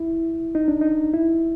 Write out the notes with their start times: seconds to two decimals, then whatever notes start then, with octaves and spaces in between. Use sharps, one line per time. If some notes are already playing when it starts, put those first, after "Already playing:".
Already playing: E4
0.55 D#4
0.68 D4
0.81 D#4
1.14 E4